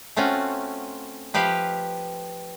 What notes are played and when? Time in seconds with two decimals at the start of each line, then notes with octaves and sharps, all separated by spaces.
0.16 A3 C4 C#4 F4 F#4
1.34 F3 G4 B4 E5 F5